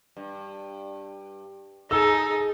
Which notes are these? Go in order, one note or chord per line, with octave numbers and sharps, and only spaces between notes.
G2
D#4 G#4 A4 E6